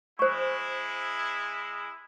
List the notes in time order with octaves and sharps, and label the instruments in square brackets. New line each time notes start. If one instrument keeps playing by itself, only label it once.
[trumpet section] G#3 E4 [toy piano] C5 C#6